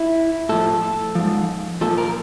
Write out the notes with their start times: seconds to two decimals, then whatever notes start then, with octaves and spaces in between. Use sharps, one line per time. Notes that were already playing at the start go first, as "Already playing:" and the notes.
Already playing: E4
0.49 A2 F3 A4
1.15 G#2 F3
1.81 A#2 F3 A4
1.98 A#4